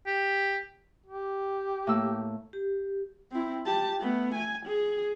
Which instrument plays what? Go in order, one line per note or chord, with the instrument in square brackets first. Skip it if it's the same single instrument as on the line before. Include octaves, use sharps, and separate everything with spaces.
[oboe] G4
[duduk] G4
[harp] A2 A#3 E6
[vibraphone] G4
[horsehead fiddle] C4 E4
G4 A5
A3 B3
G#5
G#4